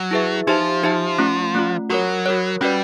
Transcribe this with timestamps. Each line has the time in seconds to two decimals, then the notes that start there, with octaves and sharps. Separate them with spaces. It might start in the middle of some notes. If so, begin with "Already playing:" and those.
Already playing: F#3
0.11 E4 G#4 B4 E5
0.47 F3 D#4 G4 C5 E5 A5
0.83 D#4 G4 C5 E5 A5
1.18 A3 C#4 F4
1.55 A3 C#4 F4
1.90 F#3 F#4 A#4 C#5
2.26 F#4 A#4 C#5
2.61 G3 C#4 F#4 B4 D5